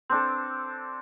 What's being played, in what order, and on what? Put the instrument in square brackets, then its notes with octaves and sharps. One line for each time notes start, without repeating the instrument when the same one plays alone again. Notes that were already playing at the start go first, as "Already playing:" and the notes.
[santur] C4 D4 A4